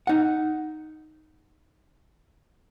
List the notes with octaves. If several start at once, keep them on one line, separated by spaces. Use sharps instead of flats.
D#4 F#5